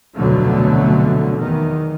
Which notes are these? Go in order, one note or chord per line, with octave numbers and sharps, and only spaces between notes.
F1 D2 B2 D3 F#3 A3
E2 D#3